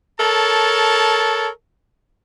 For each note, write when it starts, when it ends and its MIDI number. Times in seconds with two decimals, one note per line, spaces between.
0.20 1.49 69
0.20 1.49 70
0.20 1.49 73
0.20 1.49 81